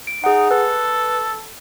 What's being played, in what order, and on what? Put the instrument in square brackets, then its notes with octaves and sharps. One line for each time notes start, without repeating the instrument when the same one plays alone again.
[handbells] D7
[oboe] D#4 [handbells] G#4 F#5
[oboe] A4 [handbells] B4